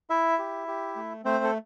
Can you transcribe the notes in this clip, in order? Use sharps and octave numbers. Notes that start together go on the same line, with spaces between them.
E4 E5
G4
G4
A3
A3 C4 C5
A4